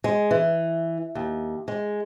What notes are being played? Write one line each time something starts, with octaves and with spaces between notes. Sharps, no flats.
G#3
E3
D#2
G#3